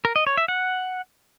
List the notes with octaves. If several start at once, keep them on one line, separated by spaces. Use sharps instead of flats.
A#4
D#5
C#5
E5
F#5